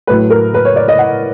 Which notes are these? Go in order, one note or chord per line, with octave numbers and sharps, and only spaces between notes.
A2 F#3 A3 B4
A#4
B4
C#5
D5
D#5
F#5